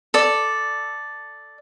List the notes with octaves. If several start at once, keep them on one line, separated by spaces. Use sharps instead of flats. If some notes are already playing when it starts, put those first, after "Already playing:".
A4 D5